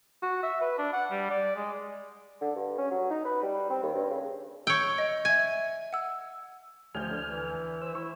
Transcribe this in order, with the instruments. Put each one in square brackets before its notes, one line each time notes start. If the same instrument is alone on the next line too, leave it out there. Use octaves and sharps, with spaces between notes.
[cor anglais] F#4
E5
B4
D4
F#5
G3
D5
G#3
[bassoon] D3
G2
C#4
F#3
D#4
B4
G3
C4
D#2
G2
C#3
[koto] C#5 G5 [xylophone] E6
[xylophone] D#5
[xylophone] E5 G#6 [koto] G#5
[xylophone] F#5 E6
[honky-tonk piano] A1 G6 [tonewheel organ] D2 G#5 F6 [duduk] F3
[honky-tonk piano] D3
[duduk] E3
[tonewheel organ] C5 E6
[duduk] E4 [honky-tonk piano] C#6